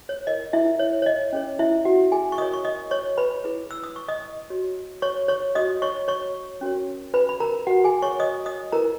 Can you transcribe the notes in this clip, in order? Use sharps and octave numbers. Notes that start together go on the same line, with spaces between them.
C#5
E4 A#4 C#5 D#5
E4 E5
C#5
C#5
D#5
C#4 G#4 C#5
E4 E5
F#4 F#5
G#4 G#5
C#6
F#4 A#4 C#5 D#5 D#6
C#6
D#5 D#6
C#5 C#6
B4 B5
E4 G#4 B4
E6
D#6
C#6
D#5 D#6
F#4 C#5
C#5 C#6
C#5 C#6
F#4 C#5 D#5 D#6
C#5 C#6
C#5 C#6
C#4 F#4 A#4 C#5
B4 B5
B5
A#4 A#5
F#4 B4 F#5
G#4 G#5
C#5 C#6
D#5 D#6
D#5 D#6
E4 G#4 A#4 B4 A#5